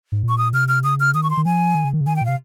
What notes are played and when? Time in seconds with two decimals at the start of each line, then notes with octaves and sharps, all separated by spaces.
0.12 G#2
0.23 A#2
0.29 C#6
0.38 D#6
0.53 C3 F6
0.68 F6
0.84 C#3 D#6
1.00 F6
1.14 D#3 D#6
1.23 C#6
1.30 C6
1.37 D#3
1.45 F3 G#5
1.75 D#3
1.84 C#3
1.93 D#3
2.01 C#3
2.07 D#3 G#5
2.16 G5
2.21 A#2
2.25 C3 F5